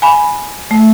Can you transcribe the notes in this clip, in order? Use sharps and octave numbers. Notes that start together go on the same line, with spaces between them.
G#5 B5
A3